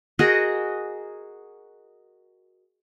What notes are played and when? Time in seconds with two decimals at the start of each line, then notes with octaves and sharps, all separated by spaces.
0.19 F#4 G#4 A#4 D#5